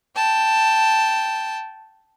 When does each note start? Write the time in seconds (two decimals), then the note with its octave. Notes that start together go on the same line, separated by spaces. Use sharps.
0.15 G5 A5